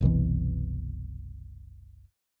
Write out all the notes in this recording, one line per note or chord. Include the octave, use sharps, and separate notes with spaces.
F#1 C2 B2 E3